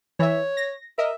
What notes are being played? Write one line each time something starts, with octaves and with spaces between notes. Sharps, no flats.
E3 C#5 E5
A#6
A#4 D#5 E5